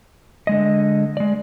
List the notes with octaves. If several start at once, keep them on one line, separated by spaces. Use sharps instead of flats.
D3 G#3 D#5
G#3 D5